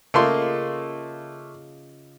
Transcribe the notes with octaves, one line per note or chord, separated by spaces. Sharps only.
C#3 A3 A#3 F4 D#5 C6